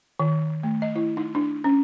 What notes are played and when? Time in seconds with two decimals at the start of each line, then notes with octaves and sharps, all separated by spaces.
0.19 D#3
0.63 A3
0.82 D#5
0.96 E4
1.17 D#4
1.35 D4
1.64 C#4